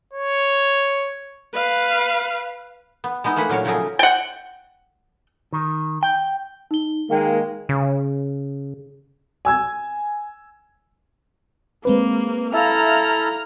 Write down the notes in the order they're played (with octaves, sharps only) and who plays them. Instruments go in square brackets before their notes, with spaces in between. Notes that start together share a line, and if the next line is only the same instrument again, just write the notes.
[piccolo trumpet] C#5
[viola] B4 F5
[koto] B3
G#3 B3 D#4 E4
A3 A#3 G#4 B4 F#5
A#2 F#3 A#4 C#5
C#3 F3 F#3 A3 G#4 A#4
[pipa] F#5 G5
[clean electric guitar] D#3
G5
[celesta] D#4 G7
[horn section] D#3 G#3 A#3 [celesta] F5 G5
[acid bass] C#3
[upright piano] G#5 E6 G#6
[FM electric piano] G#3 C4 B4 [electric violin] A#3
[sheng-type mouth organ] E4 A4 [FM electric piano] E5 F5 [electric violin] A#5 F6